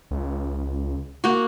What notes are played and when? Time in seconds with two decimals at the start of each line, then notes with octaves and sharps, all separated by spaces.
0.11 C#2
1.24 A#3 F#4